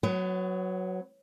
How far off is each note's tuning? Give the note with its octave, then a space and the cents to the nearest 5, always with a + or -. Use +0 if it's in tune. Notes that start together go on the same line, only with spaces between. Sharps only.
F#3 +0 B3 +30